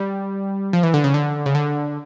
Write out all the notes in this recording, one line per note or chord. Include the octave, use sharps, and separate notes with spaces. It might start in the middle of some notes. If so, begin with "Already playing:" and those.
Already playing: G3
F3
E3
D3
C#3
D3
C#3
D3